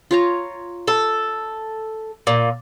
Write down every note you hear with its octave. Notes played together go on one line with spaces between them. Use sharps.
F4 C#5 A#5
A4
A#2